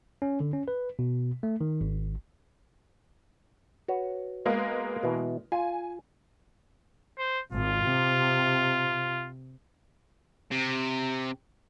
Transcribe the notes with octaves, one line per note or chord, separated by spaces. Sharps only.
C#4
D3
C#4
B4
B2
A3
D#3
G#1
F#4 B4 C#5
G#3 A#3 B3
B2 E3
F4 G#5
C5
G#1 F4
C3
C3